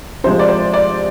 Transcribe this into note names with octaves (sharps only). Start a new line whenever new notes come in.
C3 F3 G#3 C5
D5
C5
D5